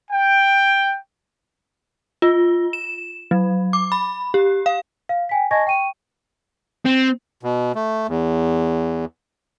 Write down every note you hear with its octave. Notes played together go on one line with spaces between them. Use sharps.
G5
F4
E7
F#3
D6
B5
G4
F5
F5
G5 G#5 B6
D#5 G#5 A5 C#6 G#6 A#6
G5 C#6 D#7
C4
B2
A3
E2